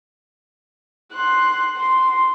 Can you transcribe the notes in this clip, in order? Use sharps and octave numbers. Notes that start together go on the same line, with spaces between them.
C6 F#6
C6